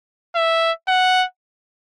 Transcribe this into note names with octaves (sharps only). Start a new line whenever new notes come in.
E5
F#5